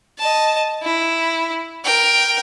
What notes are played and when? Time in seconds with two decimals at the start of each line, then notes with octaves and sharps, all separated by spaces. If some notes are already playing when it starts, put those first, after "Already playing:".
0.18 D#5 A5
0.83 E4
1.84 A#4 G5